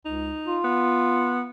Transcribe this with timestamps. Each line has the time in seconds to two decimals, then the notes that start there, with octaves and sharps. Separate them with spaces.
0.05 C#2 D#4
0.47 F4
0.64 B3